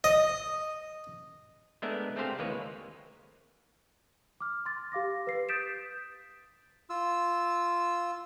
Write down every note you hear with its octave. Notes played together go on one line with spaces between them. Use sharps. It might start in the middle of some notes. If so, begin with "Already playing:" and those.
D#5
G#3 A3 B3 D4 A#4 E5
A3 C4 G4 G#4 C5 F5
D#2 E3 G#3 A#3 B4 C#5
D6 F6
C6 A6
G4 F5 D6 A#6
B4 C7
D#6 G6 A6 B6 D7 E7
F4 E6